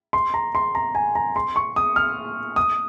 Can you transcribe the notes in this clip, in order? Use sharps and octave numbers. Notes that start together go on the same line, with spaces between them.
C6
A#5
C6
A#5
G#5
A#5
C6
C#6
D#6
F6
D#6